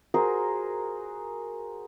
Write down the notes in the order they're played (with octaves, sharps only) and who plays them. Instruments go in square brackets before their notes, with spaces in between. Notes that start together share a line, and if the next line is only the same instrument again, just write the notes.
[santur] F#4 G#4 A#4 C5